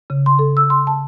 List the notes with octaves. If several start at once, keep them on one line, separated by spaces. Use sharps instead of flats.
C#3
C6
A4
E6
C6
A5